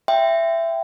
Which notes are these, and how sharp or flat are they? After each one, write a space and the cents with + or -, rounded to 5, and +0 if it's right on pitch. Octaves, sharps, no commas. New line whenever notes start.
E5 +15 G5 +0 C6 -30